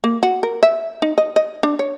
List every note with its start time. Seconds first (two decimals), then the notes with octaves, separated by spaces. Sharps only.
0.04 A#3
0.23 F#4
0.43 A#4
0.63 E5
1.02 D#4
1.18 D#5
1.36 D#5
1.63 D4
1.79 C#5